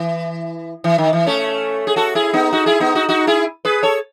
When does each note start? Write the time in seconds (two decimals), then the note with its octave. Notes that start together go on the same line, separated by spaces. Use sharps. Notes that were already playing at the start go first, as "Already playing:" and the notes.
Already playing: E3
0.84 E3
0.98 D#3
1.13 E3
1.26 A3 C#4
1.87 G#4
1.96 F#4 A4
2.15 E4 G#4
2.33 B3 D#4
2.53 D#4 F#4
2.66 E4 G#4
2.80 B3 D#4
2.95 D#4 F#4
3.09 D#4 F#4
3.27 E4 G#4
3.65 G#4 B4
3.83 A4 C#5